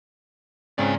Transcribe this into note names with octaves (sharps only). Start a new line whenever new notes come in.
G#2 C#3 C4 C#4 D5 G#5